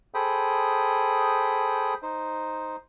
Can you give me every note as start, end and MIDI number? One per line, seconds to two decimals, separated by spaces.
0.14 1.94 68
0.14 1.94 69
0.14 1.94 72
0.14 1.94 79
0.14 1.94 83
0.14 1.94 87
2.02 2.76 63
2.02 2.76 72